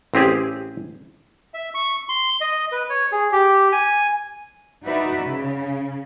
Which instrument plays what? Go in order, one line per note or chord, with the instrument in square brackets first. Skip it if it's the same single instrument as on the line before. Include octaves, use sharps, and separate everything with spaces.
[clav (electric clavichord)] A1 C4 G4 G#4
[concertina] E5
C#6
C6
D#5
B4
C#5
G#4
G4
G#5
[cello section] D#4 F#4 B4 D5 E5
C#3